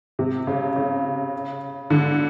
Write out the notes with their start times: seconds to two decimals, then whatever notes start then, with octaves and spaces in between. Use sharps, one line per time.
0.19 C3
0.47 C#3
0.76 C#3
1.90 D3